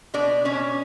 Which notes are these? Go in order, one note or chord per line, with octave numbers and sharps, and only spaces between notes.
B2 D4 D5
B2 C#4 C#5